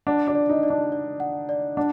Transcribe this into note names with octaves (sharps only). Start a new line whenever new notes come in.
D4 F#5
D4
D5
D#4
D5
D4
D5
F#5
D5
D4 F#5